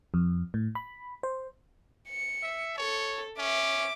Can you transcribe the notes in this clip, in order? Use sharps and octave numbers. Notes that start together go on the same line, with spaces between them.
F2
A2
B5
C5
C#7
E5
A4 C#5
C#4 E5 D6